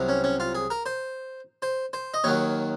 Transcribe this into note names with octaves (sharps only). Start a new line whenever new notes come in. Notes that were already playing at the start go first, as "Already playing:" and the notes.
Already playing: C2 C3 F#3
C#4
C#4
F4
G#4
A#4
C5
C5
C5
D#5
D#2 D#3 F#3 C#5